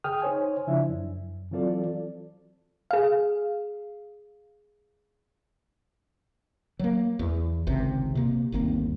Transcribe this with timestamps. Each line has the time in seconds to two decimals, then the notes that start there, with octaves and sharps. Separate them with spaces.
0.04 G#4 G5 D#6 F6
0.22 D#4 C5 C#5 G#5
0.67 C#3 F3 D4 E4 E5
0.88 F#2
1.51 E3 F#3 C4 F4 A4 D5
2.91 G#4 F5
6.79 F#3 A#3
7.19 E2
7.67 G#1 C#2 C3
8.15 C3 A#3
8.52 G1 D#2 A#3 C4